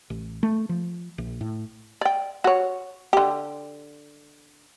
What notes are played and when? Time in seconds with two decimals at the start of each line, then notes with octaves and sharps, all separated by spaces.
0.10 A1
0.43 A3
0.69 F3
1.18 A#1
1.41 A2
2.01 D5 G5
2.44 F#4 C#5
3.13 D3 G4